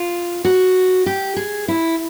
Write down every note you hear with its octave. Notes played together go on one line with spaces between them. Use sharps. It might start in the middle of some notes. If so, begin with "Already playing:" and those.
Already playing: F4
F#4
G4
G#4
E4